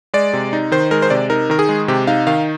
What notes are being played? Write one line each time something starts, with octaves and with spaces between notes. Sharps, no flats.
G#3 D5
C3
D#4
D#3 C5
G#3 A#4
C5
C3 D5
D#4 A#4
D#3 A#4
G#4
G#3
C3 G4
D#4 F5
D#3 F5